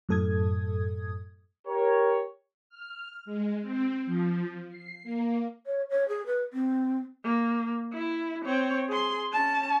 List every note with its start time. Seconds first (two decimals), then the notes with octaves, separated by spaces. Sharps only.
0.09 F#2 A2 A4 D#6 G#6
1.67 G4 A#4 C#5
2.69 F6
3.25 G#3
3.62 C4
4.06 F3
4.69 C7
5.03 A#3
5.66 C#5
5.90 C#5
6.08 G#4
6.26 B4
6.53 C4
7.25 A#3
7.93 E4
8.45 C4 C#5
8.88 G#4 C6
9.33 C#4 A5